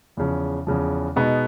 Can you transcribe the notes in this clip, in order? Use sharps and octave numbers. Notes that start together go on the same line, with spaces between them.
E2 C#3 F3
E2 C#3 F3
B2 G#3 B3 D#4